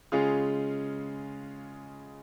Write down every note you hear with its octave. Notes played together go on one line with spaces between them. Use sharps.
C#3 G#3 C#4 F4 G#4